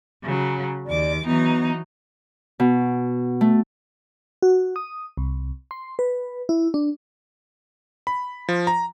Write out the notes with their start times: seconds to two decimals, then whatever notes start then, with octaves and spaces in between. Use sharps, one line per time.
0.22 C#3 F#3
0.86 D#2 D5 D6
1.25 E3 F#3 B3 D#4
2.60 B2
3.41 A3
4.42 F#4
4.76 D#6
5.17 C2
5.71 C6
5.99 B4
6.49 E4
6.74 D4
8.07 B5
8.49 F3
8.67 A#5